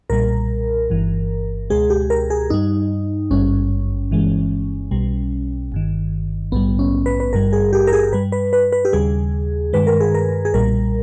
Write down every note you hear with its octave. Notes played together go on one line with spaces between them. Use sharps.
B1 A#2 G3 A#4
G1 G2 E3
C#2 B2 G#3 G#4
G4
A#4
G#4
G2 G3 D#4
G#1 G2 G3 C#4
G1 G2 E3 G#3
B1 B2 G3
G1 G2 D#3
A#1 G#2 G3 B3
C#4
B4
B4
G#1 G2 G3 A#4
G#4
G4
A#4
G#4
G2 G3 B4
B4
B4
B4
G4
D#2 C#3 G3 G#4
G2 D#3 G#3 B4
A#4
G#4
A#4
G#4
B1 A#2 G3 A#4